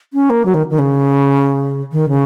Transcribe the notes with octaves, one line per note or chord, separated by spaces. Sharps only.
C#4
A#3
F#3
D#3
D#3
C#3
D#3
C#3